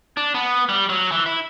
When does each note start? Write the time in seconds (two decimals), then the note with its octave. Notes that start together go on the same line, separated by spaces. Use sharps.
0.17 D4
0.34 B3
0.69 G3
0.89 F#3
1.12 E3
1.26 E4